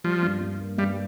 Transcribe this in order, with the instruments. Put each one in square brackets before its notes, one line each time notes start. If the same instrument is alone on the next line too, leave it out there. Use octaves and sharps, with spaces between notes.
[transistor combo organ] F3 [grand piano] G3
[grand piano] G2
G2
A#3
[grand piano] G2 [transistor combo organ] G3